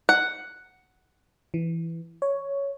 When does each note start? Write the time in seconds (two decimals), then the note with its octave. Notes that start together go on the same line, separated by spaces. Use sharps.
0.09 F#5
1.54 E3
2.22 C#5